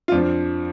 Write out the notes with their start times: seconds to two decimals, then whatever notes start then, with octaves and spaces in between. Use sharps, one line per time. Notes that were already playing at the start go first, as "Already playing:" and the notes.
0.08 F4
0.12 F2 D4
0.17 F3